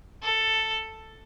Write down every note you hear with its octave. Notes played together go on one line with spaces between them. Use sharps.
A4